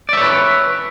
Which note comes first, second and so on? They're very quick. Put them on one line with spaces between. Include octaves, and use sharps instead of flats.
D5 E5 C#5 B4